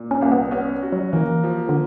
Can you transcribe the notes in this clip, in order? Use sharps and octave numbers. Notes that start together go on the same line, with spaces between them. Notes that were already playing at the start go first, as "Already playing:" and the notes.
Already playing: A#2
C#4
C2 A#3
B3
B3 C#4
F#4
F#3
E3 A#3
F3
D3